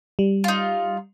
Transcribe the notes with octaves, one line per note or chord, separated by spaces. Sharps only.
G3
D#4 F4